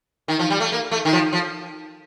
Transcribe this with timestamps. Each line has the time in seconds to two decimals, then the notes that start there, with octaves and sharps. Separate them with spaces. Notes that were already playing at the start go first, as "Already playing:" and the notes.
0.28 D#3
0.39 F3
0.50 G3
0.60 A3
0.72 A#3
0.91 A3
1.05 D#3
1.13 F3
1.33 F3